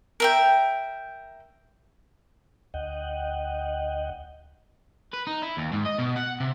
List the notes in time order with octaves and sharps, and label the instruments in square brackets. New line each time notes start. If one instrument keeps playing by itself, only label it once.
[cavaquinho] A#4 E5 G5
[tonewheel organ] D2 D#5 F#5 G5
[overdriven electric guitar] B4
D#4
E4
D#2
G#2
D#5
B2
F#5
C3